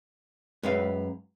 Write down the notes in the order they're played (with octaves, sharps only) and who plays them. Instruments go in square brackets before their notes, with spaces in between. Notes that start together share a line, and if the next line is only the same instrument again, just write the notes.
[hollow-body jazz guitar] F#2 B4 F5 [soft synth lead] G#3